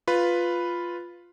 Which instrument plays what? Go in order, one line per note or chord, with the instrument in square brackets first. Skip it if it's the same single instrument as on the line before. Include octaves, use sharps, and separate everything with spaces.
[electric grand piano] F4 B4 B5